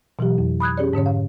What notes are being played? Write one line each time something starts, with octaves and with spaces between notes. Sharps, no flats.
B2 E3 F#3 G4
F2
B5 D#6 F#6 G#6
C#4 G4 G#4 C#5 D5
G#2 D3 C#4 C#5
F5